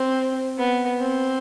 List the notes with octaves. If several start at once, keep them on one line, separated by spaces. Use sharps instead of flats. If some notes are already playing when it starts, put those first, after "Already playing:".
Already playing: C4
B3
C4